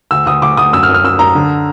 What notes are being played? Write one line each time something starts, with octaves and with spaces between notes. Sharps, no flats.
D2 E6
D2 D#6
D2 D6
D2 D#6
F#2 E6
F6
F#2
F6
F#2 E6
F#2 A#5
D3